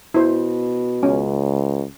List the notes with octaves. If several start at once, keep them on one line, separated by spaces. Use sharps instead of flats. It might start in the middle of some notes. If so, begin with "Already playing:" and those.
B2 E4 C5
C#2 C#4